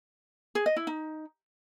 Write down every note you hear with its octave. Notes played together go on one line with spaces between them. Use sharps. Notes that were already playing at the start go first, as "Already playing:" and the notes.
G#4
D#5
E4
D#4